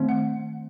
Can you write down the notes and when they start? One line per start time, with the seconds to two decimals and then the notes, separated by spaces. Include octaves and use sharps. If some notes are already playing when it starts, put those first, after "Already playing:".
Already playing: D#3 A3 C4
0.09 F#5